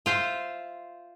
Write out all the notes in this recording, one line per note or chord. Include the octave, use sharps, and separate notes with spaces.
F4 C5 E5